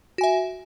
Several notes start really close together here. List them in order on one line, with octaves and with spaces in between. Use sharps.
F#4 G#5 E5